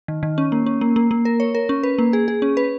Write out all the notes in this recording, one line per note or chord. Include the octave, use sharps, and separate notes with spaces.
D#3
D#3
C#4
A#3
C#4
A#3
A#3
A#3
A#4
C#5
A#4
C#4
B4
A#3
G#4
G#4
C#4
B4